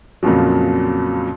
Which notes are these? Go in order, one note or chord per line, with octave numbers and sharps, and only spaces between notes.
F2 A#2 C#3 F3 F#3